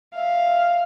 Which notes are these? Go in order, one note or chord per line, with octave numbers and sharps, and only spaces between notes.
E5 F5